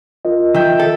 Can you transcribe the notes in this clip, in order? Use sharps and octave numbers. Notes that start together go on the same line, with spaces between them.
F4 A#4 D#5
D#3 E5 G5
A4